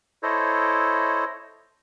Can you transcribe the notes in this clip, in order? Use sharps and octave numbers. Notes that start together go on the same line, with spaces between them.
E4 A4 C5 C#5 D#5